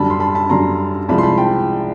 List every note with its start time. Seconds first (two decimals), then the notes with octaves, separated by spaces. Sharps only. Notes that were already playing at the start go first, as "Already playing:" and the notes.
Already playing: F#2 D3 G3 A5 B5
0.10 C6
0.20 A5 B5
0.35 A5 B5
0.49 F#2 D3 G3 A#5 C6
1.08 C2 C3 F3 G#3 A5 B5
1.18 C6
1.23 A5 B5
1.38 G5 A5